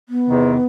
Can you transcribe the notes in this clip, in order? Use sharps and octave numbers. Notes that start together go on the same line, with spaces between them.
B3
E2 C3 D#3